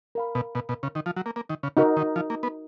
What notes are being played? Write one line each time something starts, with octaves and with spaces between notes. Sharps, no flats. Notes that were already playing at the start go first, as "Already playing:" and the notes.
A#4 F5 B5
B2
B2
B2
C#3
D#3
F3
F#3
A#3
A#3
D#3
C#3
C#3 D#4 F#4 A#4
D#3
F3
A#3
B3